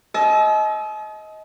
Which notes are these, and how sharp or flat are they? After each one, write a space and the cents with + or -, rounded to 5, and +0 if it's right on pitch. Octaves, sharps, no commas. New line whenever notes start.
D#5 +20 A5 -45 E6 +0